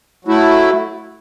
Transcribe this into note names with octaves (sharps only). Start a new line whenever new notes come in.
F#3 A3 E4